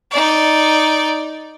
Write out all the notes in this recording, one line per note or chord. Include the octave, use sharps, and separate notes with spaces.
D#4 D5